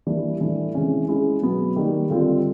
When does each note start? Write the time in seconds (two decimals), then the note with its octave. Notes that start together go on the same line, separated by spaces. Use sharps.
0.06 E3 G3 A#3 D4 G4
0.40 A2 E3 A3 D4
0.74 C3 E3 G#3 C#4
1.08 G#3 C#4 E4
1.42 B2 F#3 B3
1.76 D#3 G3 A#3
2.10 D3 G3 C4 F4